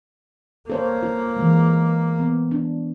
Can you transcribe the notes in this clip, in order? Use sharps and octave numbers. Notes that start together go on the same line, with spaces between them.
A#3 A4 C5 C#5
F4
E3 G#3
B3
D4